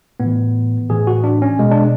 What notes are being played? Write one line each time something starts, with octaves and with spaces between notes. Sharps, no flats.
A2 B3
E3
A2 E3 G#4
F#4
D4
C#4
B2 G#3
D4